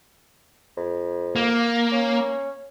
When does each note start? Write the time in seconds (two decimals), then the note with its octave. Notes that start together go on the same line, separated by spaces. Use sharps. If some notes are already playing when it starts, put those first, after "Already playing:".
0.77 F2
1.36 A#3
1.92 C#4